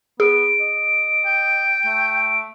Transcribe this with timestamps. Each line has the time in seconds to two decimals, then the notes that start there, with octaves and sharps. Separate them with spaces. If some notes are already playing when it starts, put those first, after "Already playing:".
0.20 B3 G#4 D7
0.60 D#5
1.25 G5
1.85 A3